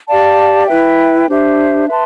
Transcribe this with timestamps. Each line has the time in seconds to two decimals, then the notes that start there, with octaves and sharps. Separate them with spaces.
0.08 G4 D5 F5 A5
0.67 E4 B4 E5 G5
1.28 D4 G4 C5 E5
1.87 B4 E5 A5 C6